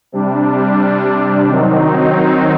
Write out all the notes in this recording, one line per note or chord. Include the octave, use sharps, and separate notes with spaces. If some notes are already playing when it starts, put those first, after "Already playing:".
C3 G3 D4
D#3 F#3 C4 D#4